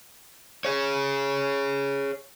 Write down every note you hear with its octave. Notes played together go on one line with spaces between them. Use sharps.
G#4 C#5